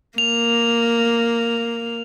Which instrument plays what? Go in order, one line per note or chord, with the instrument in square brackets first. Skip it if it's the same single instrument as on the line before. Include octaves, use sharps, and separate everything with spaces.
[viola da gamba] A#3 [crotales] F7